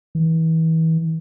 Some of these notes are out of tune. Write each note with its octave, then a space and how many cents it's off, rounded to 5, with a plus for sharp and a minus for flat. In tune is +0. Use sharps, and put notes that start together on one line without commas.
E3 -35